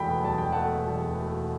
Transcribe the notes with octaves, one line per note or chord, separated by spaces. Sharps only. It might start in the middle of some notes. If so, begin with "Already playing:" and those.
Already playing: E1 E2 A3 G5 B5
B2
E2 A5
E1 G5
A3 F#5 A5
B2
E2
E1
A3
B2